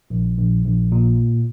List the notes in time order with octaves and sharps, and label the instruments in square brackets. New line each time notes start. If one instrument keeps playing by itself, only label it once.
[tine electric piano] A#1
A#1
A#1
A#2